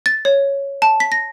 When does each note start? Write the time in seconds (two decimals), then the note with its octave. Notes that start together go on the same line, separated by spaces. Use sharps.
0.06 A6
0.25 C#5
0.82 A5
1.00 B6
1.12 A#6